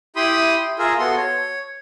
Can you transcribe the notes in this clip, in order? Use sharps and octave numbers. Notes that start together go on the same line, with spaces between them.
E4 G4 B5 C6 D#6
F4 G#4 A#4 E5
B3 F#4 A4 C6
C#5